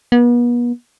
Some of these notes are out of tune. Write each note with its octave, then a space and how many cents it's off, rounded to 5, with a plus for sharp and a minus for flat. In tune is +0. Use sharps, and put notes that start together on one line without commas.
B3 -40